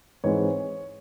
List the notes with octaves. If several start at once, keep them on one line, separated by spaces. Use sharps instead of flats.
G#2 E3 G#3 C4 C#5